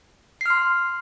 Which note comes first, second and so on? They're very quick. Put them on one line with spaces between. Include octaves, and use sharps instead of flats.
C7 F6 C6